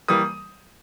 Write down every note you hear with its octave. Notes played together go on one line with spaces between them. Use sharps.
E3 G3 A#3 D#6